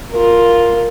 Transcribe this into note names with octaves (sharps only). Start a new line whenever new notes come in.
F4 A#4